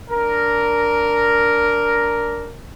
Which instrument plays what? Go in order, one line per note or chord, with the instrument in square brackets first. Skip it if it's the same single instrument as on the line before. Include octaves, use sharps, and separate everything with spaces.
[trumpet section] D4 A#4